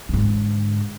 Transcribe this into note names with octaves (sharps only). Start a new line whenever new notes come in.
G#2 D3